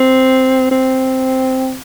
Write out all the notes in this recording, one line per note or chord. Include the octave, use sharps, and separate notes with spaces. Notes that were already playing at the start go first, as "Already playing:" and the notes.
Already playing: C4
C4